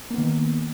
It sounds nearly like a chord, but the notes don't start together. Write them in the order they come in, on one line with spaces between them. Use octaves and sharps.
A#3 B3 D#3